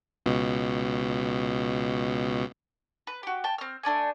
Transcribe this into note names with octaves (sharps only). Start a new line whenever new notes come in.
C#2 B2
B4
F#4 G4
G5 A5
C4 F6
A3 D4 D5 G#5